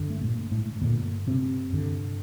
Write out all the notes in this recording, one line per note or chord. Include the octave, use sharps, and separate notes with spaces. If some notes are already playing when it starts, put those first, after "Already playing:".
Already playing: G2 D3
A3
A#2 A#3
A2 A3
G2 A#2 D3 A#3
C3 C4
G2 D3